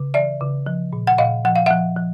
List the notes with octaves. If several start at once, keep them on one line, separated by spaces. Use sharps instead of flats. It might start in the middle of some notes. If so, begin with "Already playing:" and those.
Already playing: C#3
E3 D5 E5
C#3
F3
A#2
F#5
A#2 D#5 F5
F3 F#5
F5
F3 E5 F#5
F3